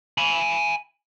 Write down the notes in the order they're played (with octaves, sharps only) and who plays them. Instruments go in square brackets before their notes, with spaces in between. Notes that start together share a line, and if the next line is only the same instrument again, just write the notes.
[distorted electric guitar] G#5 B5